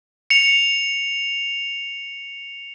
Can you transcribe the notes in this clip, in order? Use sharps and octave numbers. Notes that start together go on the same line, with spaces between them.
C#7 F7